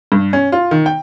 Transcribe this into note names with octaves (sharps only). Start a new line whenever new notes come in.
G2
C#4
F4
D#3
G5